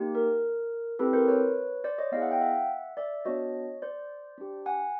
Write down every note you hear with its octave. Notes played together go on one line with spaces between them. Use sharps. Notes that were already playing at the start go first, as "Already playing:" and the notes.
Already playing: A#3 D#4 G4
A#4
C4 E4 G4 A4 B4
A#4 C5
B4 C#5
C5 D5
C#5 D#5
B3 E4 G#4 D#5 F5
E5 F#5
F5 G5
E5 F#5
D5 E5
B3 D4 F#4 C#5 D#5
C5 D5
D4 G4
F#5 G#5